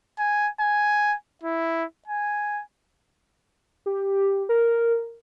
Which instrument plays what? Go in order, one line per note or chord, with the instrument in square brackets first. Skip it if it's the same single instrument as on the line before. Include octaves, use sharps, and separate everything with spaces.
[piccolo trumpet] G#5
G#5
E4
G#5
[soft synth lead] G4
A#4